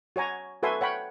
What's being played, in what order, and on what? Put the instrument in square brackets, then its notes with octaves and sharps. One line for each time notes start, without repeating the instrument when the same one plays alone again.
[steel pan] F#4 C#5 G#5 A#5
F#4 A4 B4 E5 G#5 C6
C#5 F#5 G5 B5